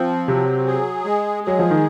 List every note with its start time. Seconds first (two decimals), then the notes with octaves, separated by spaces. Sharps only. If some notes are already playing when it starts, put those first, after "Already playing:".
Already playing: F3 C4
0.28 C3 F#3
0.66 G#4
1.05 G#3
1.44 F#3 G#4
1.59 F3
1.71 D#3